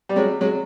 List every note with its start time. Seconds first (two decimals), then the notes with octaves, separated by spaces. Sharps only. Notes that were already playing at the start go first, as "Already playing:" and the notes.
0.09 G3
0.16 F#3 G#3
0.41 F#3 G#3